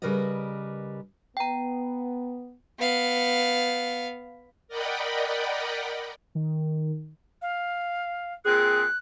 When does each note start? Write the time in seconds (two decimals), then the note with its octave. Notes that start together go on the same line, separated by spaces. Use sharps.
0.02 C#3 G3 A#4 B4 D5 D#5
1.37 B3 G5 A#5
2.79 B3 F5
4.68 A#4 D5 D#5 F#5 G5 B5
6.35 D#3
7.42 F5
8.45 A#2 C4 G#4 F#6